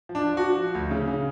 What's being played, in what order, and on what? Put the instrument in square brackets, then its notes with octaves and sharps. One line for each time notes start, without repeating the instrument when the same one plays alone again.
[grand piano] F3
D4
F3
F3 F#4
F3
D2
C#3
C#3